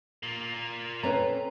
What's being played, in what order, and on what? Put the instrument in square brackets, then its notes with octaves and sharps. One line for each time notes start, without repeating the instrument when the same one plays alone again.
[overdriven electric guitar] A#2 A#3
[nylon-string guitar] A3 C4 C#4 [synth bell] B4 C#5 A#5